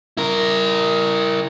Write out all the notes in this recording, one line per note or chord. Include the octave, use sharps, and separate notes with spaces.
E4 A#4